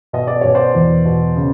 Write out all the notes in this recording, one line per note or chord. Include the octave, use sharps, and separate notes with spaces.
B2 D#5
D5
B2 C#5
C5 D5
E2
B2
C#3